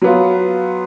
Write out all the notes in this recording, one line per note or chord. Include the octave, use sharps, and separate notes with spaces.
F#3 B3 F4